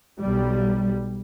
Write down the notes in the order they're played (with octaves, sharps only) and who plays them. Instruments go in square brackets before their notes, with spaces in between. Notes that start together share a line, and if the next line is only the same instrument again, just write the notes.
[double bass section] B1 G3